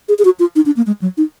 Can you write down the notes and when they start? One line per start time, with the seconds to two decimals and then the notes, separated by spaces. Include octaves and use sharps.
0.09 G#4
0.19 G#4
0.25 F#4
0.39 F4
0.56 D#4
0.66 D4
0.77 A#3
0.87 G#3
1.02 F#3
1.17 D#4